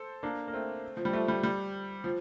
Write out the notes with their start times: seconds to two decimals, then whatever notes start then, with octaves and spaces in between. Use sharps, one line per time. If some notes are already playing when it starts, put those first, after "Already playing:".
Already playing: A4 C5
0.23 A#3 D4
0.48 A#3
0.53 A3 C4
0.97 F3
1.05 G3
1.13 F3 A3
1.28 G3
1.43 G3
2.04 F3